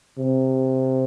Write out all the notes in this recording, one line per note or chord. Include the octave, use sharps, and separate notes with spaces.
C3